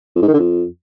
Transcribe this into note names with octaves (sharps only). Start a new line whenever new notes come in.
F2
G#2
D#3
D3
F2